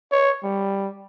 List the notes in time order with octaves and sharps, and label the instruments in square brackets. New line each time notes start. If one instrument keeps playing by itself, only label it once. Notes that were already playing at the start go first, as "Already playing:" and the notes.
[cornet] C#5
G3